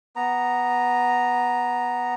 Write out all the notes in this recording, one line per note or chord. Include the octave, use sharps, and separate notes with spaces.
B3 A#5